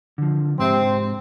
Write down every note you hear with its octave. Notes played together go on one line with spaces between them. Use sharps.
D3 F3
G#2 C3 C4